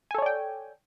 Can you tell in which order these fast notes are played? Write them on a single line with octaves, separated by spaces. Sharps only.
G#5 A4 C#5 D5 G5